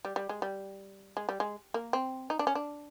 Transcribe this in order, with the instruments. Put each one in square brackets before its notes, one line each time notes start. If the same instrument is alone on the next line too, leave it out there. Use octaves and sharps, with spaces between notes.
[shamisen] G3
G3
G#3
G3
G#3
G3
G#3
A#3
C4
D#4
D4
C#4
D4